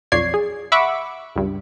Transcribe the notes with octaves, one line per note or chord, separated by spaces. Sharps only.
B1 F2 C#5 D5 G#6 C7
G#4
E5 F#5 B5 C#6 D6 E6
C#2 G2